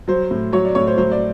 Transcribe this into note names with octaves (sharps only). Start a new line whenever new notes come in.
F#3 C5
A2
F#3 C#5
D5
A2 C#5
C5
F#3 C5
D5